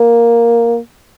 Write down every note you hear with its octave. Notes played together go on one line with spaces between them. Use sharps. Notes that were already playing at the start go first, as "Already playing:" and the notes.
Already playing: A#3